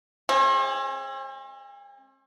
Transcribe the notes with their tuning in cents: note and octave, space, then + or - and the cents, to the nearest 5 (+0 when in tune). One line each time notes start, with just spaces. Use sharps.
G#3 +0 C4 +45 G#4 +0